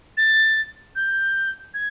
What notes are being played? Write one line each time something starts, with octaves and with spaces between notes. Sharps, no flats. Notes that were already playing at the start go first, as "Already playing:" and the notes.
A6
G6
G#6